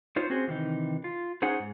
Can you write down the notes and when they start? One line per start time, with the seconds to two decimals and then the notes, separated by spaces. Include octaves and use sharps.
0.16 D#4 F4 C5 C#5
0.30 C4 C#4 F#4 G#4 C5
0.47 C3 D#3 E3 D#4
1.04 F4
1.42 C#4 D#4 G#4 C5 F#5
1.59 G#2